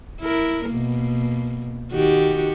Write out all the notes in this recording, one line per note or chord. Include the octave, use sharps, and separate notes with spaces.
E4 A#4
B2 A#3
D#3 F#4 G4